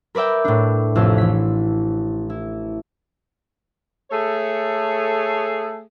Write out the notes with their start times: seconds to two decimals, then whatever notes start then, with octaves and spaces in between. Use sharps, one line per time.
0.15 A#4 B4 D5 E5 G5
0.44 A2 D4
0.95 A1 F2 C3 C4 E6
1.18 E3 B6
2.30 E4
4.11 A3 G#4 A4 C#5